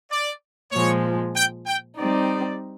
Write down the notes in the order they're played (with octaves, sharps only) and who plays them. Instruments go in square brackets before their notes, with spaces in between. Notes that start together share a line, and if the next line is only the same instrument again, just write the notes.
[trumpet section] D5
[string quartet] A#2 F3 G#3 [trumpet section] C#5
[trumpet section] G5
G5
[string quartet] G3 C4 D#4 [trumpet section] D5